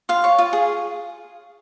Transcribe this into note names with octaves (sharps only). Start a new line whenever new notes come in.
F4 F5
C#5
F4
G#4